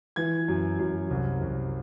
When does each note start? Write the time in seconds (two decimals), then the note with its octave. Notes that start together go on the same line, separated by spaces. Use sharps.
0.16 E3 G#6
0.48 F#2
0.79 F#2
1.10 C2
1.41 C2